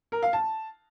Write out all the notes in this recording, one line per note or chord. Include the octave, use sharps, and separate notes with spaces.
A#4
F5
A5